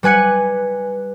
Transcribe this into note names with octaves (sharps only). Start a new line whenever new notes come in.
G3 B4 G#5 F#6 C#7